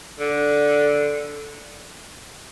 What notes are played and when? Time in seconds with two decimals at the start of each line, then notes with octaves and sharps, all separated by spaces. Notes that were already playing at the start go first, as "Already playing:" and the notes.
0.19 D3